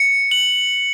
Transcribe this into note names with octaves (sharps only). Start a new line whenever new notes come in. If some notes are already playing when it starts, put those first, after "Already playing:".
Already playing: C#7
F#7